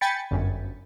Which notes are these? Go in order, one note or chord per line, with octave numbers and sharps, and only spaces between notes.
G5 G#5 B5 A6 B6 C#7
G1 F#2